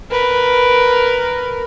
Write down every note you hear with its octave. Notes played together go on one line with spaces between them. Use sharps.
A#4 B4